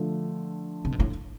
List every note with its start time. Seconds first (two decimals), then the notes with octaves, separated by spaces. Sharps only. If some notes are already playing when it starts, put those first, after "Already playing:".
Already playing: D3 F3 A3
0.85 C3
0.92 B2
1.00 A2